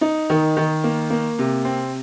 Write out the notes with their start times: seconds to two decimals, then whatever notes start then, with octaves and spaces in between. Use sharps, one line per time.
0.01 D#4
0.30 D#3
0.57 D#3
0.84 A#3
1.10 A#3
1.39 C3
1.65 C4